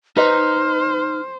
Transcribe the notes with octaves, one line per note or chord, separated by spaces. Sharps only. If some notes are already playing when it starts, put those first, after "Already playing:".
D#4 B4 C5 D#5 A#5 F6